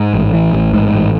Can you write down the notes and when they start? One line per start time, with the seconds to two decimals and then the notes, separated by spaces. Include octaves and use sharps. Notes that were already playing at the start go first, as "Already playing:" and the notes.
Already playing: G#2
0.14 A1
0.33 E3
0.53 A1
0.74 G#2
0.94 A1